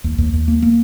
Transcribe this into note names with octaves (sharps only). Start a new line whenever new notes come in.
D#2
D#2
D#2
A#3
A#3